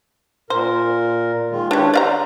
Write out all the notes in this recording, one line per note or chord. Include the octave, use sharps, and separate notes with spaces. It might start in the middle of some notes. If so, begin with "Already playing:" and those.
A#2 A#4 C5
D#3 G#3 F4
D4 E4 G4 B4 C#5
C5 D5 F5 A#5